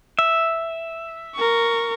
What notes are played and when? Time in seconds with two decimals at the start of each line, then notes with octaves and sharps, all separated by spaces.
0.19 E5
1.35 A#4 C#6